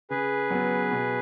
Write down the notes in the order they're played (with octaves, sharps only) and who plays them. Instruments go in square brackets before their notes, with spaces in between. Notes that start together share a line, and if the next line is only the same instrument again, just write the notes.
[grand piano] C#3 [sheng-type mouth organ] G#4 B4
[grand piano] F#3 B3
B2